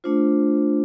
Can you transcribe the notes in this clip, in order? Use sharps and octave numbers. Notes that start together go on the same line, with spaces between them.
A3 D4 F4 C5